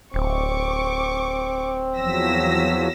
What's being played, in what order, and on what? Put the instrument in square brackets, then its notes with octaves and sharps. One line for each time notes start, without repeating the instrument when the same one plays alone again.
[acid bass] D1 [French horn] C4 [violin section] C#6 D6
[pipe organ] E2 F3 F#3 [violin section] E6 A#6 B6